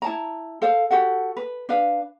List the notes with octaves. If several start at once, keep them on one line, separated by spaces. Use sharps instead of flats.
E4 A5 A#5
A4 C5 F5
F#4 G4 A4 F#5
B4
D4 B4 F5